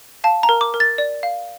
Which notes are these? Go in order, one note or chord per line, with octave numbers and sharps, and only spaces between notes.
F5 A5
A#5
A#4
D6
A#4
A6
D5
F5